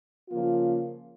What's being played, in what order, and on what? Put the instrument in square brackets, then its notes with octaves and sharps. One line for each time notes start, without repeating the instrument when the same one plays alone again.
[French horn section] C#3 F3 A#3 F4